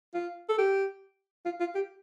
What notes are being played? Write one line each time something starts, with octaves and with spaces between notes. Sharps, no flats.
F4
A4
G4
F4
F4
G4